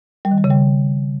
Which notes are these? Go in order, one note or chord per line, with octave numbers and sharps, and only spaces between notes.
G3
D#3
G3
C#3
G3